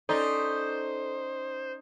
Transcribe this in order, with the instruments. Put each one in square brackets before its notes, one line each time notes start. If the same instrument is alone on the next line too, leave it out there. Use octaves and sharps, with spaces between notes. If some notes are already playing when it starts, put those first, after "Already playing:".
[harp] C#4 D5 B6 [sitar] D#4 [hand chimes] A4 [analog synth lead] C5